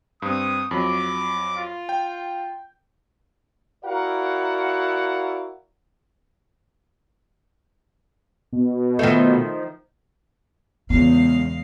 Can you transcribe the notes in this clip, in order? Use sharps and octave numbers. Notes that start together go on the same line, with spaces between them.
G2 C4 D#6
F2 F#3 D6
F4
G5
E4 F#4 A#4 D5 F5 F#5
B2
D#3 F3 A3
E2 C#3 G#3 B3 F4 F5